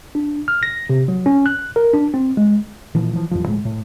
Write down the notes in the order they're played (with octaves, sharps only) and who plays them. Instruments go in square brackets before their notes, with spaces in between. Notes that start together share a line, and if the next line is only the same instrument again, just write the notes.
[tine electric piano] D4
F6
A#6
C3
F#3
C#4
F#6
A#4
D4
C4
G#3
[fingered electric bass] A#2 E3 F3
E3 F3
E2 G2 F3
D1 A2 G#3
A2